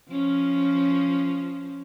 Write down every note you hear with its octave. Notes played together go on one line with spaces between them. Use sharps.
F3 C#4